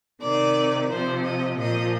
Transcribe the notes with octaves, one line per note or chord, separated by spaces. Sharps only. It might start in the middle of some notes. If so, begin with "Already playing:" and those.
C3 D#3 D5
C3 F3 C5
D#5
A#2 F3 D#5